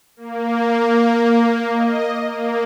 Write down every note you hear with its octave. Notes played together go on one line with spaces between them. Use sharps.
A#3
D#5
A#3